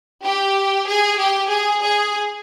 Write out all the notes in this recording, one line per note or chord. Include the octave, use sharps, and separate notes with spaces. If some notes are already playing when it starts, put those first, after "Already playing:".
G4
G#4
G4
G#4
G#4